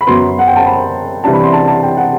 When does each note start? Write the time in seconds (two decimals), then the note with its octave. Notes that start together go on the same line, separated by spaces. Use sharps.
0.01 B5
0.07 F#2 F#3 B3 C6
0.39 F#5
0.48 G5
0.56 A5
0.66 B5
1.24 C3 E3 G3 D4 A5
1.33 B5
1.43 C6
1.53 A5
1.68 A5
1.83 G5
1.97 F#5